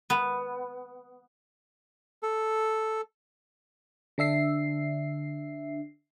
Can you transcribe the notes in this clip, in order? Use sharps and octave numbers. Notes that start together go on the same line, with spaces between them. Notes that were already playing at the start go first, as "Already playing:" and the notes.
B3
A4
D3 D4 E5 C7